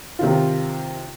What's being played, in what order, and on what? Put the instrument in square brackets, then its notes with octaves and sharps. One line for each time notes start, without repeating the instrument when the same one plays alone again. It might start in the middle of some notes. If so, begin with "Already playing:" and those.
[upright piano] C3 D#3 F4